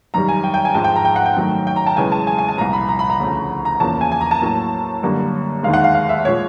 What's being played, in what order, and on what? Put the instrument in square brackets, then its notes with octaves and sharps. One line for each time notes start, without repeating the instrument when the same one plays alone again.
[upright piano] F#2 D#3 G3 A#5
G#5
G5
G5
G#5
G#2 F3 G#3 A5
G5
A#5
G5
F#5
G5
F#2 D#3 F#3 A3
G5
A#5
A5
F#2 C#3 E3 G#3 G#5
A5
G#5
G#5
A5
C2 A#2 F3 A#5
B5
A#5
B5
A#5
D2 C#3 F3 A3
A#5
E2 C#3 F3 A#3 A5
G#5
G#5
A#5
A5
A2 F#3 A#3
F#2 D3 G3 A#3
D#2 D#3 G#3 F5
F#5
F5
F5
E5
A#2 F3 G#3 C#5